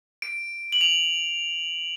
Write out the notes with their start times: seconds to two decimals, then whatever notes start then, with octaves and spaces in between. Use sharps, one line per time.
0.22 D7
0.72 F#7
0.81 F7